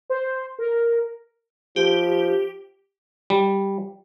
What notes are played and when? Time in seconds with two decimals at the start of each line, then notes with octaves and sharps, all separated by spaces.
0.10 C5
0.59 A#4
1.76 F3 G4
3.30 G3